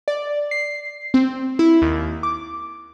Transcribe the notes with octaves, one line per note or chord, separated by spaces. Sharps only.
D5
C7
C4
E4
D#2
D6